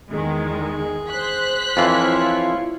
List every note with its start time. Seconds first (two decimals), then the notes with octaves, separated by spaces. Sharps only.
0.10 E2 D#3 G#3 G#4
1.09 C5 F#6 B6
1.77 F2 E3 E4 F4 C#5